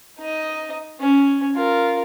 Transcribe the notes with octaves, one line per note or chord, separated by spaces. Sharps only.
D#4 D#5
C#4
F4 A#4